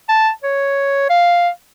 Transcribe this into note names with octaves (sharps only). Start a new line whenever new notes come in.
A5
C#5
F5